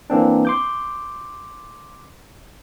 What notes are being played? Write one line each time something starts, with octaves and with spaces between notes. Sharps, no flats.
E3 A#3 C4 D4
C6 D6 G6